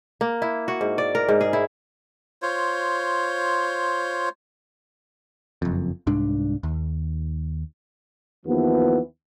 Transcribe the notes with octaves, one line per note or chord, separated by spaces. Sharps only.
A#3
E4
F#4
G#2
D5
A#4
G#2
G#4
E4
F4 C5 C#5
F#1 F2
C2 G#2 D4
D#2
D#2 E3 F3 B3